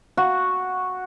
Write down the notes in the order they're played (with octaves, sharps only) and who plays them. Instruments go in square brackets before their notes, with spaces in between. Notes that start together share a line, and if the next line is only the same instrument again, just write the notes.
[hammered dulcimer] F#4